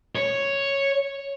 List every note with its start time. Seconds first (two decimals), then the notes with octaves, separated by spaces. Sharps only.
0.15 C#5